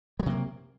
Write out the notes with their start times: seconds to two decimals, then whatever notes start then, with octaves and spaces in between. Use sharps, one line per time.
0.20 G3
0.23 F#3
0.26 C3
0.29 A#3